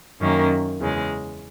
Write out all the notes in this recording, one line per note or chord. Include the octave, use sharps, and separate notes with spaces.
F#2 D#3 A#3 C#4
E2 C#3 G#3